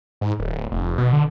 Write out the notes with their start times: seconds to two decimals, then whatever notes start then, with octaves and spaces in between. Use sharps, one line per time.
0.21 G#2
0.39 D1
0.71 F1
0.98 B2
1.13 D3